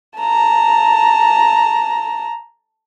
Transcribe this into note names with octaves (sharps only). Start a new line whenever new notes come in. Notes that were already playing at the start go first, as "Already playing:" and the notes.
A5 A#5